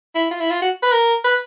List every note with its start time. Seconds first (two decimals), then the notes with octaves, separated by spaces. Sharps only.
0.15 E4
0.31 F4
0.41 E4
0.51 F4
0.62 F#4
0.83 B4
0.92 A#4
1.24 B4